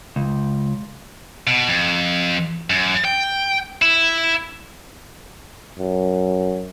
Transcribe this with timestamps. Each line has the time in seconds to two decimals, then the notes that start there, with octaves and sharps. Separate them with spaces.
0.16 C#2
1.47 B2
1.67 F2
2.70 F#2
3.05 G5
3.82 E4
5.79 F#2